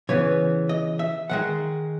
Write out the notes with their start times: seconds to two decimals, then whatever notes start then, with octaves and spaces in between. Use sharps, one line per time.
0.09 C#3 E3 B3 C#5
0.69 D#5
0.99 E5
1.30 D#3 G#3 F#5